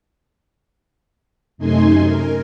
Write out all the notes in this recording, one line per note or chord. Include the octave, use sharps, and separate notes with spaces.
F#2 C3 A3 D#4 G#5 C6
A#4